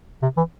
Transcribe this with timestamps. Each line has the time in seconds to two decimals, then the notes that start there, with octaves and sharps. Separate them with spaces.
0.23 C3
0.37 E3